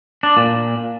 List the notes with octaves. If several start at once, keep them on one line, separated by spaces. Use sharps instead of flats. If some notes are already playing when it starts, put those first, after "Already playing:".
D4
A#2